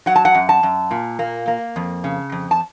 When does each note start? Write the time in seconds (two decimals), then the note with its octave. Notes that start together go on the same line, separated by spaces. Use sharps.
0.06 F#3 F#5
0.16 A5
0.25 F#5
0.35 F#2
0.49 A5
0.63 F#2
0.91 A#2
1.19 A#3
1.48 A#3
1.76 F2
2.04 C#3
2.32 F2
2.51 A5